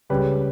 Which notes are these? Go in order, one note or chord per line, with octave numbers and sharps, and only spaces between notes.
C#2 C#3 G3 C#4 G4 B4